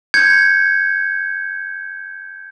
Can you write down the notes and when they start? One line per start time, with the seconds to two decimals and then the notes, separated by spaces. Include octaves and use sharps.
0.14 G6 G#6 C#7